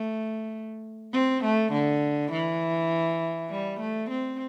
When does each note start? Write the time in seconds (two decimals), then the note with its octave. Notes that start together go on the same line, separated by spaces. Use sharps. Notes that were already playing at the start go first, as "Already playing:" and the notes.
Already playing: A3
1.13 C4
1.44 A3
1.72 D3
2.32 E3
3.51 G3
3.80 A3
4.10 C4